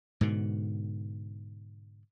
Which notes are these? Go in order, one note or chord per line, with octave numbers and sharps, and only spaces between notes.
G#2 B2 D3